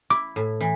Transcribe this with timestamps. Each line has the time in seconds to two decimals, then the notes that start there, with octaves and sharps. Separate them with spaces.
0.10 E4 D6
0.36 A2
0.61 E3